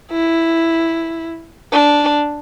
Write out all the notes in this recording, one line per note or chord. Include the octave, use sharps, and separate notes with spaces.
E4
D4